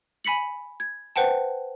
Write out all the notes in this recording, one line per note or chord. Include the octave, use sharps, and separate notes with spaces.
G#5 B5 B6 C#7 F#7
G#6
B4 C5 F#5 G5 A5